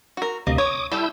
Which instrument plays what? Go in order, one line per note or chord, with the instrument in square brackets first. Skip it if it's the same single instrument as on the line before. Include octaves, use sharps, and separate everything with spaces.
[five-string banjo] F#4 A#4
[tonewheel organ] D2 C3 D#5 [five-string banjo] A#3
[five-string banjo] C#5 [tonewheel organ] D6 D#6
[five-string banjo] G3 A4 [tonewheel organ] E4 E6 G6